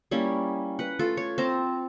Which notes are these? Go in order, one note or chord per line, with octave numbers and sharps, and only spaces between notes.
G3 A#3 C#4 E4
B4 F#5
A3 F4 A4
C#5
C4 A5 A#5